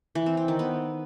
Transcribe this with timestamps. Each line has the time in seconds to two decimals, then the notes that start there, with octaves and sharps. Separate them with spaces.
0.15 E3
0.26 C4
0.37 C4
0.48 D#3
0.59 B3